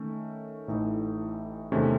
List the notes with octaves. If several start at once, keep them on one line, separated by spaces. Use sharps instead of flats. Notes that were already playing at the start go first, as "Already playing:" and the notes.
Already playing: D#3 A3 C#4
A1 A2 E3 A3 D#4
E2 C3 D#3 A3 C#4